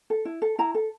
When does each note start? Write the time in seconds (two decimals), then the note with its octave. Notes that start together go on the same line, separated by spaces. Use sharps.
0.10 A4
0.25 E4
0.42 A4
0.59 E4 A#5
0.75 A4